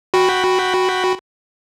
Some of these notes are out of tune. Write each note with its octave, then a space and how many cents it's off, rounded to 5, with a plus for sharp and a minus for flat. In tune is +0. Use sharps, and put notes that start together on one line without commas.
F#4 +0 G5 +0 B5 +0